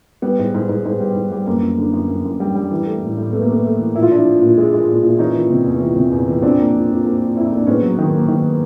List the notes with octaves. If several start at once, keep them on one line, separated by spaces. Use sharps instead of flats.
G3 B3
G#2
G#2
G#2
G#2
G3
G#2
G3
F#2 A#3
F#2
D3
F#2
F#2
F#2
G3
G3
E3
A3
A2
A2
A3 B3
A#3
A3 B3
A3
E3
A#2 E4
F4
F3 D4 E4
F3
A#2
G#3
G#3
A#2
A#2
E3 C#4 D#4
E3
C3
E2
E3
C3
E2
E3
F2 C4 D4
A#3
F3
F2
A#3
F3
F2 E4
D#4
A#3
D4
G#2 B3 C#4
F#3
D#3
A#3
D#3